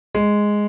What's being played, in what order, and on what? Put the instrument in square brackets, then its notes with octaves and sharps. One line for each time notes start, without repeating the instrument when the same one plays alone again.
[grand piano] G#3